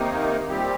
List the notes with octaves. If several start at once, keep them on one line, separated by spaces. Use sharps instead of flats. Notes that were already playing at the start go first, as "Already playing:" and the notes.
Already playing: C3 D#3 A#3 D#4
A#2 G3 C4 G4